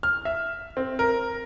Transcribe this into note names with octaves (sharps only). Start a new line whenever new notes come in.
F6
E5
C4
A#4